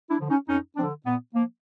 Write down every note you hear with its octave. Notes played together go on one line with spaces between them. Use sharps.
D4 E4
D3 F3
C#4 D#4
F2 C#4 D#4
F3 C4 D4
D3
A#2 B3
F3 A#3